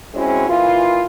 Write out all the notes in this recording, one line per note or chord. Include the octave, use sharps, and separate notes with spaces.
G#3 C4 C#4 E4 F#4
A#2 E3 F4